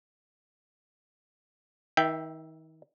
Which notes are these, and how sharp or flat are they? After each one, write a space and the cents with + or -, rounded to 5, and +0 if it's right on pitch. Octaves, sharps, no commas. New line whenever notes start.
D#3 +35 E5 +0 G5 +0